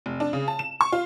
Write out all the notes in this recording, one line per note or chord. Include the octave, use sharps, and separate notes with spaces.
F1
D4
C#3
A5
E7
C#6
F4